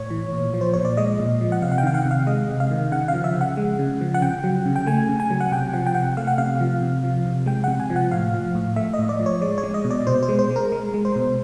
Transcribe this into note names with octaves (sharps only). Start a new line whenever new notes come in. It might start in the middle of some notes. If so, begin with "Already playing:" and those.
Already playing: A2 C#5
E3
A#2
F3
C5
A#2 C#5
D5
G#3 D#5
A#2
F3
F#5
C3 F5
F#5
G5
D#3 F5
F#5
C3
F5
G#3 D#5
C3
F5
D#3
C#3 F#5
F5
F3
E5
C#3
F#5
G#3
C#3
F3
F#5
C#3 G5
F#3
C#3
G5
A3 G#5
C#3
G#5
F#3
F#5
C3 G5
F3 F#5
G5
C3 F#5
A3 F5
F#5
C3 F5
F3
C3
F3
C3
G#3 G5
C3 F#5
G#5
F3
F#5
A2 F5
F3
A2
A3 E5
D#5
A2
D5
F3
C#5
G#3 D5
C#5
G#3
D#5
B2
D5
B2 C5
C5
G#3
C5
G#3
A#4
G#3
G#3
C5
B2